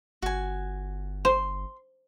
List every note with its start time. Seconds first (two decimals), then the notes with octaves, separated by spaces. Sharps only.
0.22 G1 F#4 G#5
1.25 C5 C6